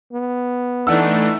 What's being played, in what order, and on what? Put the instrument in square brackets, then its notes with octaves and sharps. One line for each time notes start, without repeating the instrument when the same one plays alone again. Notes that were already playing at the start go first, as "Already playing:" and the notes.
[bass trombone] B3
[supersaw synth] E3 A3 [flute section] D4 D#4 [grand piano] F#5 E6